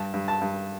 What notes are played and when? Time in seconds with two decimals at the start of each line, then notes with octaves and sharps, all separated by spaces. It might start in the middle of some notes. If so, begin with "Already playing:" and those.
Already playing: G2 A5
0.14 G2
0.28 A5
0.41 G2